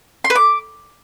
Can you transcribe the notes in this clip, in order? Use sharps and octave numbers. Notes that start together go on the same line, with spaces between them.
C6
B4
D6